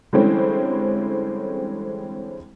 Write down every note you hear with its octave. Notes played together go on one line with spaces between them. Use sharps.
D3 E3 G3 G#3 C4 C#4